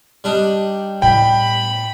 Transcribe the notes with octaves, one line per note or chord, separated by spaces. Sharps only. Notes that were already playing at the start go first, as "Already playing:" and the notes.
G3 D4 D#4
A2 B3 G5 B5